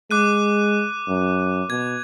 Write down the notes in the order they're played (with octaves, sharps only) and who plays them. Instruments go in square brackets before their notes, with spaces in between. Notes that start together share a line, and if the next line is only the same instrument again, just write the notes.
[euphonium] G#3 [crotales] D6 F#6 D#7
[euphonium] F#2
[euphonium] B2 [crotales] G#6